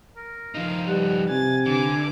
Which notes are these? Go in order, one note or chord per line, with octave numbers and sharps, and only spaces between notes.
A#4
F3 D#4 F5
G3 B4 F#5
C3 G#5 A6
D3 B4 G#5 D6